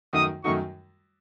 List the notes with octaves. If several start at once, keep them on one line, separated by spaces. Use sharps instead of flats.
F#2 D#3 A3 D#4 F#4 D#6
F#2 D#3 A3 D#4 F#4 C#6